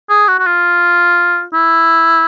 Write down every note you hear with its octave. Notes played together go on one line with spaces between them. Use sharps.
G#4
F#4
F#4
F4
E4